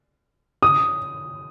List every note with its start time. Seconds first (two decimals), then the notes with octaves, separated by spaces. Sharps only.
0.62 D#6